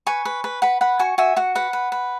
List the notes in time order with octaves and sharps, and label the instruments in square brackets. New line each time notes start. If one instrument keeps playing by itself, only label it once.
[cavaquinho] B4 G#5 C#6
B4
B4
B4 F#5 B5
B4 F#5 B5
F#4 G#5 C#6
F#4 E5 G#5
F#4 F#5
B4 F#5
B4
B4